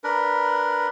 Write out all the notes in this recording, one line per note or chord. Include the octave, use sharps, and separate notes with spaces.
D4 A#4 B4